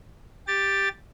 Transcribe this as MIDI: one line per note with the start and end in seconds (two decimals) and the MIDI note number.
0.47 0.89 67
0.47 0.89 93